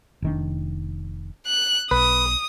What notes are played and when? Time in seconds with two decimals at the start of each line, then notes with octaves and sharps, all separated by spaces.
0.22 F1 D#3 D4
1.47 F#6
1.91 B1 B4 D#6